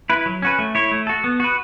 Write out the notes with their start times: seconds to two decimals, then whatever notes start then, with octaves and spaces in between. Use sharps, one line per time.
0.10 E4 B4
0.26 F#3
0.42 C#4 F#4 B4
0.59 A3
0.75 E4 C#5
0.91 A3
1.07 F#4 A4
1.24 B3
1.40 F#4 B4